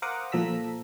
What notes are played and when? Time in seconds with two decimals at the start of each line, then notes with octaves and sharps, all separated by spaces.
0.02 A#4 C5 F5 F#5 D6 D#6
0.32 A#2 F3 A4 A#5 E6 B6